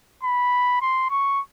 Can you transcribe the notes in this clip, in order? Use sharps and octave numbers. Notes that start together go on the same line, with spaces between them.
B5
C6
C#6